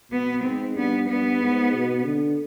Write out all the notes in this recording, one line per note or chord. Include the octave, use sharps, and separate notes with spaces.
B2 B3
G#2 C4
G2 B3
G2 B3
G#2
B2
D3